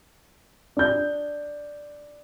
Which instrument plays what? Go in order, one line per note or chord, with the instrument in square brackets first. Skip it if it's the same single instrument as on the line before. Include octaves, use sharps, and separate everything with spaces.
[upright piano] D4 G6